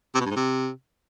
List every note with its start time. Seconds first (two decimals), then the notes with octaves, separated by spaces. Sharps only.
0.15 C3
0.20 B2
0.25 G2
0.31 G#2
0.36 C3